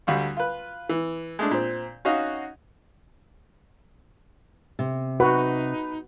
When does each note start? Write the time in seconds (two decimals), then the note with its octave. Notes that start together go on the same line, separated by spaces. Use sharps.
0.07 D2 D3 G3 F4 C#6
0.37 F4 B4
0.89 E3
1.39 G#3 A3 D4
1.51 A#2 C4
2.05 C#4 D#4 F#4 D#5 F5
4.79 C3
5.20 D#4 F#4 B4